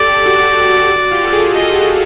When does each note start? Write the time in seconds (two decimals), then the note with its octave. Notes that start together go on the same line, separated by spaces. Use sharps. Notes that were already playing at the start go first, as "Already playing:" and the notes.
Already playing: G4 A4 D5
0.18 G4
0.26 F#4
0.90 F#4
1.11 F4 G4
1.24 A4
1.32 F#4 G#4
1.54 F4 G4 D#5
1.69 G4
1.76 F#4